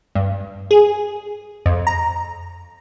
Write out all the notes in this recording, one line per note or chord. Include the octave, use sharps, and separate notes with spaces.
G2
G#4
F2
A#5